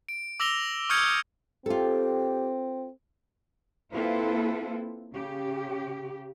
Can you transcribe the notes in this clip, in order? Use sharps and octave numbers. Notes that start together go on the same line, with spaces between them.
D7
D6 E6 A#6 F7 G7
C#6 D#6 F6 G6 G#6 C#7
C4 F4 G4 A4
A#3 C4 E4 F4 A4 B4
C#3 G4